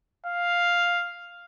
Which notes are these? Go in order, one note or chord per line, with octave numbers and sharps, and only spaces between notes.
F5